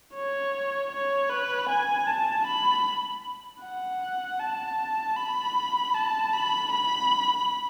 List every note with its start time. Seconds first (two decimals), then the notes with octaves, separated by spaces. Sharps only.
0.14 C#5
0.91 C#5
1.30 B4
1.69 G#5
2.07 A5
2.46 B5
3.61 F#5
4.39 A5
5.16 B5
5.95 A5
6.33 B5
6.71 B5